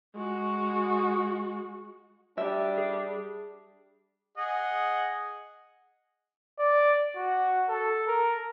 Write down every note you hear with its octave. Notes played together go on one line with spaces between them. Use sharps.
G#3 F#4
G3 D4 E5
G#4
G#4 D#5 F#5
D5
F#4
A4
A#4